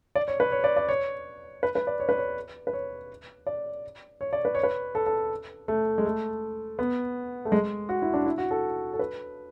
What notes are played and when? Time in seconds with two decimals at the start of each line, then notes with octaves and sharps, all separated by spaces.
0.15 D5
0.28 C#5
0.40 B4
0.52 C#5
0.64 D5
0.76 D5
0.89 C#5
1.63 B4
1.75 B4
1.87 D5
2.00 C#5
2.09 B4
2.18 C#5
2.67 B4
2.73 C#5
3.47 D5
4.21 C#5
4.33 D5
4.45 B4
4.55 C#5
4.63 B4
4.95 A4
5.06 A4
5.68 A3
5.98 G#3
6.05 A3
6.79 B3
7.45 A3
7.52 G#3
7.89 F#4
8.02 E4
8.14 D4
8.26 E4
8.38 F#4
8.51 A4
8.93 A4
8.99 B4